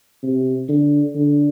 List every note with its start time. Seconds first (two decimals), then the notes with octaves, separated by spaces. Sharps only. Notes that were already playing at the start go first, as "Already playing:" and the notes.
0.23 C3
0.68 D3
1.15 D3